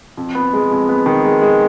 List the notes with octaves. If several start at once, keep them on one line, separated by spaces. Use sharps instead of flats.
F2
B3
G#3
F2
B3
D#3
G#3
G#3